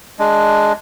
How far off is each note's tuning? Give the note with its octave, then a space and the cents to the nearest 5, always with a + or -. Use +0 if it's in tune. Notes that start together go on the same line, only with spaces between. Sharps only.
G#3 +0 D4 +0